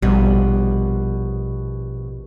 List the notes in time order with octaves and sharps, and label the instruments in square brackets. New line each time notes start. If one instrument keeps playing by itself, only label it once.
[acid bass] A#1 [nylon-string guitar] B2 G3